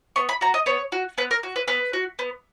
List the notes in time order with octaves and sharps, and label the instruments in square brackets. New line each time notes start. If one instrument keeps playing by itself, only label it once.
[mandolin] B3 C#6
B5
F#4 A#5
D#5
B3 C#5
F#4
B3 B4
A#4
F#4
B4
B3 B4
F#4
B3